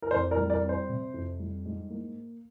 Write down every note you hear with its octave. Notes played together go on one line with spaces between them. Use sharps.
A#4
F2 C5
A#4 D5
G3
A#4 D5
C4
C5
C3
F2
G3
G#2
A#3